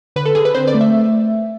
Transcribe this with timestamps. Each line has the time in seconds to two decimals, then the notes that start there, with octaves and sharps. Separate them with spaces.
0.16 D3 B4
0.25 A4
0.35 D3 G#4
0.45 B4
0.55 C4 C5
0.67 D5
0.74 A3
0.81 E5